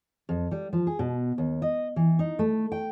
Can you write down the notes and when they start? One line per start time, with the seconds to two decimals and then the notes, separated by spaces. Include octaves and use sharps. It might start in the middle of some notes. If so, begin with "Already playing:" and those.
0.29 F2
0.51 G3
0.73 F3
0.87 G#4
0.99 B2
1.38 D#2
1.62 D#5
1.96 E3
2.19 D#4
2.39 A3
2.72 G5